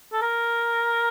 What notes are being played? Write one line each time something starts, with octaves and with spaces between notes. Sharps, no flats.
A4
A#4